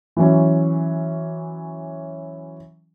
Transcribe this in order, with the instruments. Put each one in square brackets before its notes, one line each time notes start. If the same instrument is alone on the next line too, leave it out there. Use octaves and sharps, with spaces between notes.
[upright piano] E3 F#3 C#4